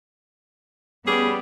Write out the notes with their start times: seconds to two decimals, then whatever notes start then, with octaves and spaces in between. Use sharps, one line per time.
1.07 G3 B3 C#4 G4 G#4 D5